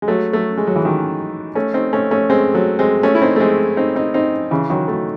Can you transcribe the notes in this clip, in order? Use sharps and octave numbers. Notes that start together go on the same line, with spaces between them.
G#3
F#3 A3
F#3 A3
G#3
F#3
E3
D#3 F#3
A3 C#4
C4 D#4
A3 C#4
A3 C#4
G#3 C4
F#3 A3
G#3 C4
A3 C#4
E4
C4 D#4
A3
G#3 C4
C4 D#4
C4 D#4
C4 D#4
C#3 E3
D#3 F#3
F#3 A3